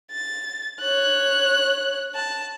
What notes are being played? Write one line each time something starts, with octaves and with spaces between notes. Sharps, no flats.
A6
C#5 F#6
A5